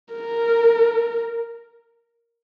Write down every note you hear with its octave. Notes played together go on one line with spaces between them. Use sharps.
A#4